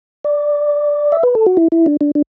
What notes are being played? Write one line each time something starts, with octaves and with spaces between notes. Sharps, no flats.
D5
E5
B4
A4
F#4
E4
E4
D4
D4
D4